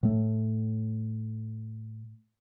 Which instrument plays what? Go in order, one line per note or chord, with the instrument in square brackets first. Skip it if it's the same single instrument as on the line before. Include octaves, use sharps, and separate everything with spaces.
[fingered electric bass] A2 A3